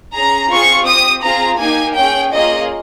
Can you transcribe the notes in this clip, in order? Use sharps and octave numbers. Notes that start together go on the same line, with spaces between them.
C#4 G#4 A#5
C4 F4 G#4 C#6
C4 G4 D#6
C4 F4 G#4 A#5
A#3 D#4 G4 G#5
C#4 G#4 G5
A#3 C#4 F4 G#4 D#5